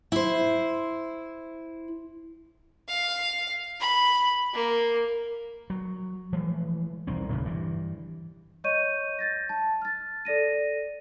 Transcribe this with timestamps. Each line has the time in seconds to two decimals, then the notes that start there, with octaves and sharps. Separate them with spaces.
0.12 E4 C5
2.88 F5
3.80 B5
4.54 A#3
5.70 F#3
6.33 E3 F3 G#3 A3
7.07 E1 C2 D#3 C4
7.31 D1 F2 C#3 A3
7.45 G2 E3
8.64 C#5 D#5 C#6 G6 D#7
9.19 G6 A6 A#6
9.49 A5
9.82 F6 A6
10.25 A4 D5 A#6 D#7